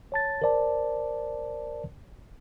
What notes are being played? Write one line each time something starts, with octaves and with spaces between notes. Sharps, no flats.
C#5 A5 A6
A#4 C5 D5 A5